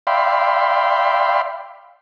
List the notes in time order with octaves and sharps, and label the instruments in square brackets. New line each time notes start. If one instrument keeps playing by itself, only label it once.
[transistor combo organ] D5 E5 F5 G5 B5 C6